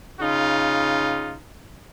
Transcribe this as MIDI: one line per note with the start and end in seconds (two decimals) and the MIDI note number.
0.21 1.36 49
0.21 1.36 63
0.21 1.36 65